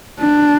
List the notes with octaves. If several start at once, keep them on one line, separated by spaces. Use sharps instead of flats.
D4